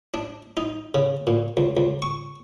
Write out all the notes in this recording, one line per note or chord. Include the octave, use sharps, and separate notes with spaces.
D4
D#4
C#3
A#2
C#2
C#2
C#6